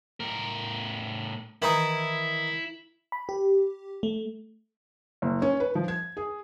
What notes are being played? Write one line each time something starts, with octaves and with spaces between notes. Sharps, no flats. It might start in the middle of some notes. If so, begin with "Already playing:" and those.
A2 A#4
D#3 E3 D#4 E4
B5
G4
A3
F#1
C#4
B4
F3
G#6
G#4